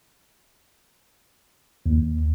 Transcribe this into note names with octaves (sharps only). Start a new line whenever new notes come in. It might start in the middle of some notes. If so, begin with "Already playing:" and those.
D#2